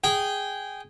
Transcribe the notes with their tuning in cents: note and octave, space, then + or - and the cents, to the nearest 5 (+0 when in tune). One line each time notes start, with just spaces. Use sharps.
G#4 -10 G5 -15